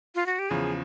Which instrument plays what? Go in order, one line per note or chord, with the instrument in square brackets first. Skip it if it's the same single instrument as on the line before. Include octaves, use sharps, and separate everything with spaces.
[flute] F4
F#4
G4
[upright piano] E2 C#3 F3 [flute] G#4